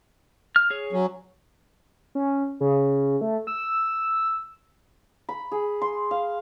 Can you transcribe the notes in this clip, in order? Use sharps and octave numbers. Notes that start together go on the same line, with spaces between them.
F6
G#4 C#5
F#3 C#4
C#4
C#3
A3
E6
B5
G#4
C6
F5